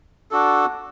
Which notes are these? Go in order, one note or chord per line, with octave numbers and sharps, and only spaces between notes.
D4 F#4 A4